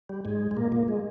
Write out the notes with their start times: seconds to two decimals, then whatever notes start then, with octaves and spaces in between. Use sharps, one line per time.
0.09 G3
0.25 G#2 G#3
0.51 G#3
0.57 A#2 A#3
0.72 A#2 A#3
0.88 G#3